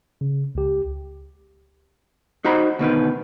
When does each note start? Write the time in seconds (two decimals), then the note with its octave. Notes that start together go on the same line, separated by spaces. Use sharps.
0.21 C#3
0.55 C#2 G4
2.44 D#4 F#4 C5 A#5 B5
2.79 D2 B2 D#3 B4